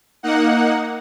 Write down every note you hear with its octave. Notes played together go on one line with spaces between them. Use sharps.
A#3 D#4 F#5